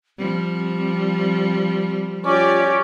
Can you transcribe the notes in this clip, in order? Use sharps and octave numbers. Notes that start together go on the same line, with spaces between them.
F3 G3 C4
C#4 F4 G4 D5